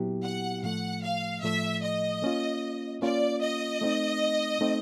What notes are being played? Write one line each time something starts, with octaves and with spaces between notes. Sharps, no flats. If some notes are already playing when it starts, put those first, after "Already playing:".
Already playing: A#2 F#3 B3 E4 G4
F#5
A2 F3 A3 F#5
F5
A2 F3 A3 E5
D#5
A#3 C#4 F4
A#3 C#4 F4 D5
D#5
A3 C4 D#4
A3 C4 D#4